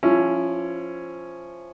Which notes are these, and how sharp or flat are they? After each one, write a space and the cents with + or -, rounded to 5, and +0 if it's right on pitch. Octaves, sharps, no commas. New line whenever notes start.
F3 +0 C#4 +0 E4 +20